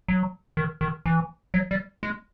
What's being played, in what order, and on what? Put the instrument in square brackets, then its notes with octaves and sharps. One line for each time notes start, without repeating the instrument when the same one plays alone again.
[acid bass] F#3
D#3
D#3
E3
F#3
G3
G#3